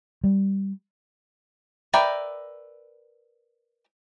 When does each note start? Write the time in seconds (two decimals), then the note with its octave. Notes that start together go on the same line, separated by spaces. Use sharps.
0.24 G3
1.94 A#4 B4 D5 E5 G5